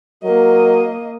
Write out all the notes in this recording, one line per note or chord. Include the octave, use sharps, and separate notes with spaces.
F#3 A#3 A#4 D#5